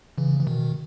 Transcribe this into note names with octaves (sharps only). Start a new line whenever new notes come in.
C#3 E3
E3
B2 D#3